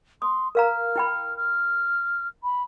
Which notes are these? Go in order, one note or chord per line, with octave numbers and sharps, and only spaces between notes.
C6 D#6
A#4 F5 A#5 F6
E4 G5 B5
F6
B5